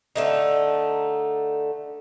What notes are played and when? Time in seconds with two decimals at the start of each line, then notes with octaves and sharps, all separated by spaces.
0.16 D3 A3 D#4